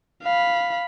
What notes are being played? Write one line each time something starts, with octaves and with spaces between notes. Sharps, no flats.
F5 B5